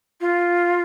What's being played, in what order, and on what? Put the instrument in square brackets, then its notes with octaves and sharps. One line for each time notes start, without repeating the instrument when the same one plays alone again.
[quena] F4